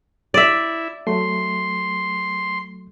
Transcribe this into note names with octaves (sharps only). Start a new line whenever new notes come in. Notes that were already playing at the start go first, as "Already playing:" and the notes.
E4 D5 E5
F#3 A3 C6